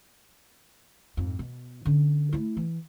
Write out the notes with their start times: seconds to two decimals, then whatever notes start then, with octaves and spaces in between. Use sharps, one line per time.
1.17 F2 G#2
1.39 B2
1.85 D3 C#4
2.33 A3 E4
2.57 E3